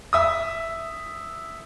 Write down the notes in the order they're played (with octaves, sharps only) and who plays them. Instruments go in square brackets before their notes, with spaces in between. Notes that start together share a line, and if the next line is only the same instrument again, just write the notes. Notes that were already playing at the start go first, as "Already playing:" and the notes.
[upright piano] E5 D#6